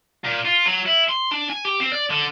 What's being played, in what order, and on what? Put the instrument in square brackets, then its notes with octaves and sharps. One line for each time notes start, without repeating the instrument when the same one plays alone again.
[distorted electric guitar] A#2
F4
F#3
E4
C6
D4
G#5
G4
C4
D5
D3